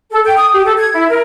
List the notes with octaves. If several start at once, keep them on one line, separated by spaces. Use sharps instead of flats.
A4
G5
D#6
G4
A4
G#6
E4
A#4